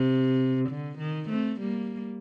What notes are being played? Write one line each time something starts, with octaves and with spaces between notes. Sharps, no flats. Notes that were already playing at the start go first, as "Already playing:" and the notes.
Already playing: C3
D3
D#3
A3 C4
G3 A#3